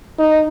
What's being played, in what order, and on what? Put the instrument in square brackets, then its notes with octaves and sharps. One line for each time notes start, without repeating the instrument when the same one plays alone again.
[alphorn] D#4